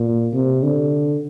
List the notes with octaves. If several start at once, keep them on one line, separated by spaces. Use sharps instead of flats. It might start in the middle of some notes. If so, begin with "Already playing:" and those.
Already playing: A#2
C3
D3